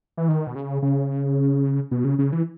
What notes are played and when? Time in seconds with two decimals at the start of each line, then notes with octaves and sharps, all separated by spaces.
0.17 E3
0.28 D#3
0.47 B2
0.55 C#3
0.82 C#3
1.91 B2
2.04 C#3
2.19 C#3
2.32 E3